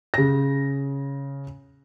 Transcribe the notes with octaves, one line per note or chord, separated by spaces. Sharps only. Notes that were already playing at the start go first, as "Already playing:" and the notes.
C#3 A#6